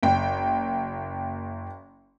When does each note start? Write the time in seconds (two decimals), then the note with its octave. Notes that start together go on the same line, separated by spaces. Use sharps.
0.03 F#1 G5